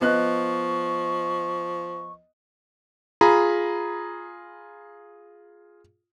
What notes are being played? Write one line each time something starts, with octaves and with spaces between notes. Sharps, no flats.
F3 B3 D#5 C#6 F#6
F4 G#4 A#5 B5